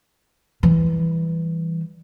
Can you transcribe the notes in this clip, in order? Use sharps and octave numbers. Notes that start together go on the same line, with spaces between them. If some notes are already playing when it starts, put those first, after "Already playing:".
E3 G3